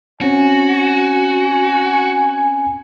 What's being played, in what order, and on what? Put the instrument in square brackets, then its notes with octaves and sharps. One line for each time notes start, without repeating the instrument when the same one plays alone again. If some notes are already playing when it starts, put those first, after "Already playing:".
[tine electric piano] C4 C#4 [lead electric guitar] F#4 [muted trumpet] G#5